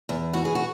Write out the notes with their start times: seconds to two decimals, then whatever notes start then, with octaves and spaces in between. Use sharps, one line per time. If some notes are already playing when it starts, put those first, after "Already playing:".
0.09 E2
0.33 E3 F#4
0.45 G#4
0.55 F#4